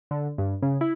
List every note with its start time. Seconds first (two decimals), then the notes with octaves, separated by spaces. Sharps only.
0.11 D3
0.38 G2
0.62 C#3
0.81 E4